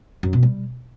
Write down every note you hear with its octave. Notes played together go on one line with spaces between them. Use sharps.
F#2
B2
G3